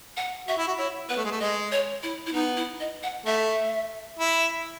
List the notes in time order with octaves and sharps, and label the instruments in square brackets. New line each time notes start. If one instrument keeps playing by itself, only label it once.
[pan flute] F#5
[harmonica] F#4 [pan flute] E5
[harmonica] E4
F#4
[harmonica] E4 [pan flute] C#5
[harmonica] B3 [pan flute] B4
[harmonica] A3
G#3
A3
[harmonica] G#3 [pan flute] D#5
[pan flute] C#5
E4
E4
[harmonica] B3 [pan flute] D#4
[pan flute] E4
D#5
F#5
[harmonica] A3 [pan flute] E5
[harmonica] E4